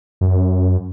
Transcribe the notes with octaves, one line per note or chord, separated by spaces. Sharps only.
F#2